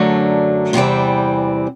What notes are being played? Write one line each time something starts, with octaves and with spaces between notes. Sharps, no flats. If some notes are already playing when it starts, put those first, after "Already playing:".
Already playing: F#2 D3 F#3 A3 D4
E2 C3 E3 G3 C4